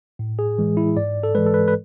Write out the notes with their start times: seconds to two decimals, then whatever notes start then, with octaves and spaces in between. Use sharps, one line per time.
0.19 A2
0.39 G#4
0.58 E3 G#3
0.77 E4
0.97 G#2 D5
1.23 A4
1.35 E3 G#3 B4
1.46 A4
1.54 B4
1.68 B4